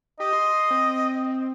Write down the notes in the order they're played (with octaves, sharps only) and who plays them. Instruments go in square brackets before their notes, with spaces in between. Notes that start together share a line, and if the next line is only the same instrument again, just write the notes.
[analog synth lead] G4 [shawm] D#5
[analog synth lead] C6
C4